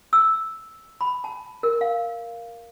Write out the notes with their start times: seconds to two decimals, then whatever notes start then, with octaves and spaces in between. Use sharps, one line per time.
0.13 E6
1.01 B5
1.24 A5
1.63 A#4
1.81 F5